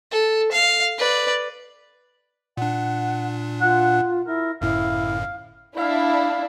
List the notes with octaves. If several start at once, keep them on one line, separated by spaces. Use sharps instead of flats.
A4
F5
B4 D5
A#2 D4 F#5
F4 F#5
E4 A#4
G1 F#2 A2 E4 F5
D4 E4 F5